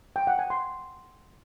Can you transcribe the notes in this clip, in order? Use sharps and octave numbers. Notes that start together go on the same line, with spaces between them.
G5
F#5
G#5
C6